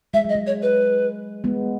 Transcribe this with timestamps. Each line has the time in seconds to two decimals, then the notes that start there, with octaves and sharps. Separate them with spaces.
0.14 G#3 E5
0.25 F#3 D#5
0.36 G#3
0.47 C#5
0.62 B4
1.44 G#3 B3